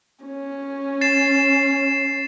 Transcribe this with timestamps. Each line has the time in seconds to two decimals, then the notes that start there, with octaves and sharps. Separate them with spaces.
0.25 C#4
1.01 A6 C7 E7